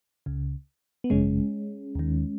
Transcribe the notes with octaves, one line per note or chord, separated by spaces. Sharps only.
C#2 C#3
B3
G#1 F#2 C#3 G#3 C#4
D#2 D#3